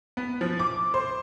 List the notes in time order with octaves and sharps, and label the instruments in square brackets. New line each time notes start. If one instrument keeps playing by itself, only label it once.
[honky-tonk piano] B3
F3
D6
C5